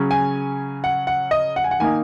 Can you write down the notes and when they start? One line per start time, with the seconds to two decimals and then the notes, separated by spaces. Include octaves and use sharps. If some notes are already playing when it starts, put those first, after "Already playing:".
Already playing: C#3 F#3 C#4
0.11 G#5
0.84 F#5
1.07 F#5
1.31 D#5
1.56 F#5
1.64 G#5
1.71 F#5
1.80 D#3 A#3 D#4 G#5